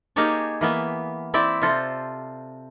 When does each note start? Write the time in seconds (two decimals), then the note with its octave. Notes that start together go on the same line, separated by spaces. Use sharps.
0.16 A#3 D#4 G4 G#4 C#5 A5
0.61 E3 A#3 B3
1.34 C4 E4 D5 E5 G5
1.62 C3 F4 A4 C5